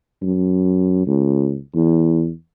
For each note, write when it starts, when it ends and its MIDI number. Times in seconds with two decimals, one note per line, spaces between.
0.22 1.04 42
1.07 1.58 37
1.75 2.30 40